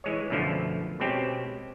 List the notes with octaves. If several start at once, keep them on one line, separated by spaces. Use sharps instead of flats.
E3 G#3 C#5
F#2 B2 D3 F3 A3
B2 G#3 C4 C#4 G4